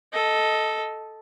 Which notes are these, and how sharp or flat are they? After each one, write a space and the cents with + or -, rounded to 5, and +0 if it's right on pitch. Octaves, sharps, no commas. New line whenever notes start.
A4 -5 D#5 +10